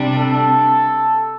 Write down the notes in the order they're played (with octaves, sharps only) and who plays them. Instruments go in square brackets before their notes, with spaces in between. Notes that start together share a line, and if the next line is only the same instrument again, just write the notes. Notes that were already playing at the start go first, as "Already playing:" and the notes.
Already playing: [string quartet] C3 G3 D4
[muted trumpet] A4